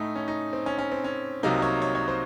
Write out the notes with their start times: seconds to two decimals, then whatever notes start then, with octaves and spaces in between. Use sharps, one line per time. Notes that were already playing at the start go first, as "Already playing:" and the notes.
Already playing: A2 A3 D#4
0.15 C#4
0.28 D#4
0.53 C4
0.66 C#4
0.78 C#4
0.92 C4
1.04 C#4
1.43 C2 C3 F#3 A#3 D#4
1.62 C#5
1.82 C#5
1.95 C#5
2.08 C5